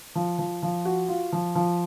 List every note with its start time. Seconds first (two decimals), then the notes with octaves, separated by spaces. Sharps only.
0.15 F3
0.39 F3
0.63 F3
0.85 F#4
1.08 F4
1.33 F3
1.55 F3